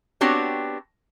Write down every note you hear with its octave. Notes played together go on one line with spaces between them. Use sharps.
B3 C4 D4 F#4 G4 C#5